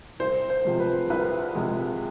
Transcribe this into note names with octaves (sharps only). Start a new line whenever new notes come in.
C2 C5
C5
C3 F3 G#3
B4
C2 B4
C3 F3 G#3